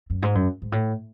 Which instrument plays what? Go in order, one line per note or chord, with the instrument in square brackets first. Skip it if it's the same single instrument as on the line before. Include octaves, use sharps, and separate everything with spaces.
[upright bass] F#2
G#2
F#2
G#2
A2